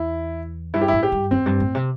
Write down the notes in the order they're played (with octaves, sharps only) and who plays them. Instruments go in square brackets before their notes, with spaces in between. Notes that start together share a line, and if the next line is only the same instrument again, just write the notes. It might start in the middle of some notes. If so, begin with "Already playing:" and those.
Already playing: [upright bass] E2 [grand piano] E4
[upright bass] G2 [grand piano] E4
[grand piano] G4
[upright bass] A2 [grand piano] E4
[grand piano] G4
[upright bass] G2
[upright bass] E2 [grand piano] C4
[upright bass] G2
A2
C3